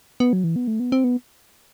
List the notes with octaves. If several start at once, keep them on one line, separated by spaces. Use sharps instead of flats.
B3
F#3
E3
B3
A3
B3
C4
B3